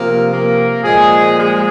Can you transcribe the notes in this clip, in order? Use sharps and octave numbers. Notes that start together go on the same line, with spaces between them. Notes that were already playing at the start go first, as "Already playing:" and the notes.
Already playing: C3 F3 A#3 A#4
A#3 A#4
A#2 F3 G#3 G#4
G#3 G#4